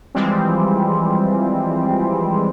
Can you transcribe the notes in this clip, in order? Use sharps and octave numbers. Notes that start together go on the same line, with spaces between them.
E3 F3 G3 G#3 C4